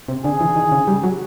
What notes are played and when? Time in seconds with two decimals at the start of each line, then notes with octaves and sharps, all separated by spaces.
0.08 C3
0.24 D3 G#4
0.40 E3
0.56 D#3
0.72 C#3
0.87 G3
1.03 F#3